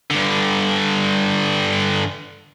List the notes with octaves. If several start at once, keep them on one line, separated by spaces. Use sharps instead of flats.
G2 D3